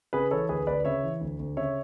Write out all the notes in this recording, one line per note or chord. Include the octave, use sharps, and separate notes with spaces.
C#3 G#4 B4
E3 A4 C#5
D2 G#4 B4
D2 B4 D5
C#3 C#5 E5
E3
D2
D2
C#3 C#5 E5